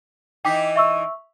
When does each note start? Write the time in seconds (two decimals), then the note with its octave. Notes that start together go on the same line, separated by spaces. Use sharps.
0.45 E3 D#4 G5 D6 B6
0.76 E5 C#6 E6